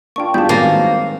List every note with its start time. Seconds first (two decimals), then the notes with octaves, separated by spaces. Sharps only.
0.16 A#3 D4 F4 G5 C#6
0.34 G3 D4 F4 G#4 D5 A5 B5 G6
0.49 D#3 F#3 G#3 A#3 C4 G#5 A6 A#6